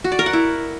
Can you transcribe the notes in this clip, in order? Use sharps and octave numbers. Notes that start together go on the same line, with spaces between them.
F#4
D5
A#4
F#5
E4